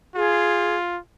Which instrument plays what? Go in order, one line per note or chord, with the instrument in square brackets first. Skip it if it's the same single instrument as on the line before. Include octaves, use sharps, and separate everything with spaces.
[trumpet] F4 [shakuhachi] G#4